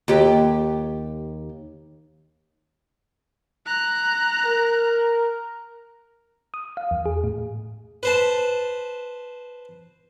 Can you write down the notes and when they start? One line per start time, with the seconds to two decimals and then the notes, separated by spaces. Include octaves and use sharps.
0.08 D#2 G4
3.66 A#5 F#6
4.45 A#4
6.54 D#6
6.77 F5
6.91 E2
7.06 G#4
7.24 A2
8.03 B4 C5 A5